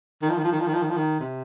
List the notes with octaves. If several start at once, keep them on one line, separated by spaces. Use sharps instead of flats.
D#3
F3
D#3
F3
D#3
F3
D#3
F3
D#3
F3
D#3
C3